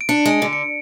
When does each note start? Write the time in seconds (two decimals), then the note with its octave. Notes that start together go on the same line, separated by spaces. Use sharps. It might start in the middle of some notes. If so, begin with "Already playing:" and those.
0.01 D7
0.09 D4 C#7
0.26 G#3
0.31 D7
0.42 D3
0.53 C#7